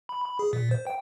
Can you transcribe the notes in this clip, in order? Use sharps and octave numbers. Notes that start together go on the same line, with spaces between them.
B5
B5
G#4
A#2
C5
G5